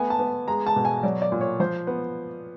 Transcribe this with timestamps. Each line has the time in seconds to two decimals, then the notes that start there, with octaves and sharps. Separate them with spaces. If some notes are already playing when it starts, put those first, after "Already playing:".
Already playing: A3 B3 G#5
0.10 A5
0.19 B3
0.47 G#3 A#5
0.67 A5
0.76 B2
0.85 G#5
1.03 F#3 D5
1.22 D5
1.32 A#2
1.41 C#5
1.60 F3 C5
1.87 B3